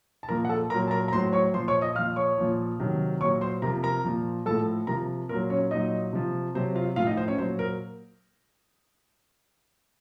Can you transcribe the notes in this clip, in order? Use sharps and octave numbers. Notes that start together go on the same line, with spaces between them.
A5
A#2 F3 A#4 A#5
F#5
A4 A5
A#2 F#3 A#4 A#5
A5
A#4 A#5
A#5
A2 F#3 C5 C6
C#5 C#6
A#2 F3 C5 C6
C#5 C#6
D#5 D#6
A#2 F3 F5 F6
C#5 C#6
A#2 F3
C3 D#3 F#3
A#2 F#3 C#5 C#6
C5 C6
C3 F3 A#4 A#5
A#4 A#5
A#2 F3
A2 F3 A4 A5
C3 F3 A#4 A#5
A#2 F#3 A#4
C#4 C#5
A#2 F#3 D#4 D#5
C3 F3
C3 F#3 C5
F4 F5
A2 F3 F4 F5
D#4 D#5
C5
C#4 C#5
A#2 F#3 C5
A#4